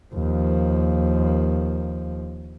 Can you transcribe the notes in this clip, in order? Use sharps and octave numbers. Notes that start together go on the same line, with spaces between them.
D#2 F3